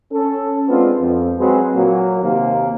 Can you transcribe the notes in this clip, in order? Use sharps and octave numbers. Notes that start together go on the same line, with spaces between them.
C#4 A4
G#3 B3 C4 D4 F4
F2 F3
F#3 G#3 C4 F#4 G#4 B4
A#2 F#3 A#3
D#2 C3 A#3